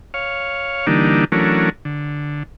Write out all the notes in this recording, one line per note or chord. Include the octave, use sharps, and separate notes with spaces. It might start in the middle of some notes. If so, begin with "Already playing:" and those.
C#5 F5
D3 E3 G3 A#3 D4 D#4
E3 F#3 A3 C#4 D4 A#4
D3